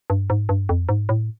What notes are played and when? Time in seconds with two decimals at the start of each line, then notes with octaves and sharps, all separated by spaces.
0.10 G2
0.30 G#2
0.49 G2
0.69 F2
0.89 G#2
1.09 A2